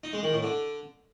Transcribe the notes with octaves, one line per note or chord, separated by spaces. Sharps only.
D#4
G#3
D#3
A2
D3